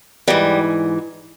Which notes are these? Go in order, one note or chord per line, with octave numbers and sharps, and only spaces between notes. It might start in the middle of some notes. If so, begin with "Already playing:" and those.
G#2 E3 G3